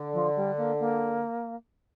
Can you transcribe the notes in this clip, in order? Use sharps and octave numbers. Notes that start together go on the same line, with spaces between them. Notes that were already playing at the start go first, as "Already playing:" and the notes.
Already playing: D3
F3
G3
A#3
A#3